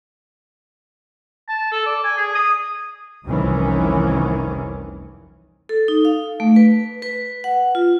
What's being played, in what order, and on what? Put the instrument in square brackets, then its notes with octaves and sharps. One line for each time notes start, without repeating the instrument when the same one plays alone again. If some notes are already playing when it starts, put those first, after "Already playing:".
[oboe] A5
A4
D5
G#5
G#4
D#6
[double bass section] F1 C2 D#3 E3 C#4
[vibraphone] A4
D#4
F5
A3
B4
B4
F#5
F4